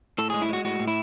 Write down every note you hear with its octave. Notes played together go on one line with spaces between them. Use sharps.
A2 A4
G#3 G#4
E4
G#3 F#4
A2 F#4
A2
E4